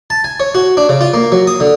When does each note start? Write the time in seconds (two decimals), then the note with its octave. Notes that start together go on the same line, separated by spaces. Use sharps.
0.10 A5
0.24 G#5
0.40 C#5
0.55 F#4
0.77 D4
0.89 C#3
1.01 F4
1.14 A#3
1.32 F#3
1.47 D#6
1.60 D3